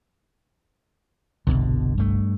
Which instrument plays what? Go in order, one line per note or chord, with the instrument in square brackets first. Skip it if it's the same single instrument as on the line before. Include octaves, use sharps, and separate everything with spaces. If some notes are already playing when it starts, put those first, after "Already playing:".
[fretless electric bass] G1 C2 [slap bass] B2 D3
[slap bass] G2 A3